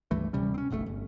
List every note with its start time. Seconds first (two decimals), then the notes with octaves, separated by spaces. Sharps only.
0.11 C#2 G2 E3 A3
0.33 D1 C3 G3 C#4
0.54 C4 C#4
0.70 F#1 B1 C3 A3
0.86 G1